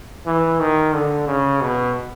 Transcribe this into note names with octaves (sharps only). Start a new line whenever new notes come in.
E3
D#3
D3
C#3
B2